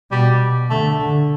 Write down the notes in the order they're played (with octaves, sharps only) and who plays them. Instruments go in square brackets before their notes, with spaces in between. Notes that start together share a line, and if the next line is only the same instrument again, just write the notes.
[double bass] B2 [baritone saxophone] G3
[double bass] D3 [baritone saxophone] A3
[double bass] D3